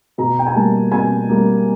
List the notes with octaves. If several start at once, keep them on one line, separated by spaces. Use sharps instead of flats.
B2 A#5
G5
G#5
G3 A#3 A5
B2 G#5
G3 A#3